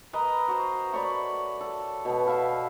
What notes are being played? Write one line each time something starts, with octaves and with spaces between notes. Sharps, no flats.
A#4 B4 D#5 A#5
F#4 C5
A3 C#5 D5 B5
A4
B2 B3
E5 F5 B5